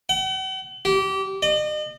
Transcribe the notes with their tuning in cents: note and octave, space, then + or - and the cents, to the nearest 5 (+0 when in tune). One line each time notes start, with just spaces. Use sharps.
F#5 +45
G4 -25
D#5 -40